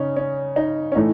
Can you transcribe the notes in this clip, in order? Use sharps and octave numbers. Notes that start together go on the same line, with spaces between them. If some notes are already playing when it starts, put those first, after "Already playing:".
Already playing: C#3 C#4 D#4
C#4
D#4
C#4
A2 E3 A3 D#4